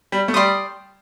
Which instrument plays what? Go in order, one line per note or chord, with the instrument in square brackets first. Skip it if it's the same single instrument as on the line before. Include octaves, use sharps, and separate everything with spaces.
[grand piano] G3
A3
[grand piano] G3 [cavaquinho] D5 G5 C6 D#6